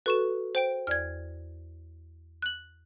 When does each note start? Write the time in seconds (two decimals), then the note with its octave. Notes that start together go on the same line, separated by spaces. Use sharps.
0.06 F#4 A4 B4 C#6 E7
0.55 C5 G5 D7
0.87 E2 D5 F6 G#6
2.42 F#6 F#7